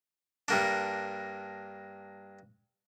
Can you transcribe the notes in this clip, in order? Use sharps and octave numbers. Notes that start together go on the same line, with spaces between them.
G2 A#3 D4